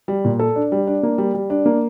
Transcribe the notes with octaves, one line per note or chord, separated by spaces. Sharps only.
G3
A#2
A4
D4
G3
D4
A#3
G3
G3
D4
A#3